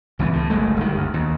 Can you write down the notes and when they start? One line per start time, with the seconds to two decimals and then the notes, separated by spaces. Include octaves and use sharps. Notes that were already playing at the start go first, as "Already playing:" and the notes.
0.19 C#2 E3 A3 B3
0.33 A2
0.50 F#1 G#3 A3
0.77 G1 D#3
0.95 D2
1.14 D#2